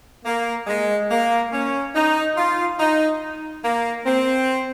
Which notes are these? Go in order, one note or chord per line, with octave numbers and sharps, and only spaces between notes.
A#3
G#3
A#3
C#4
D#4
F4
D#4
A#3
C4